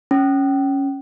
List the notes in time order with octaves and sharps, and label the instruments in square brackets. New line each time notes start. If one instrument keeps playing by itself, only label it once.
[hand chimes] C#4